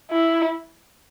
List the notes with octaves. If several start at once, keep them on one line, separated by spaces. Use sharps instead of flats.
E4